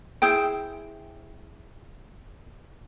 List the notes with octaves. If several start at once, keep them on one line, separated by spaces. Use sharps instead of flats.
E4 G#4 C5 G5